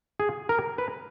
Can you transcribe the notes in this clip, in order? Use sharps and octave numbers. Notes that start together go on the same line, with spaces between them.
G#4
A#4
B4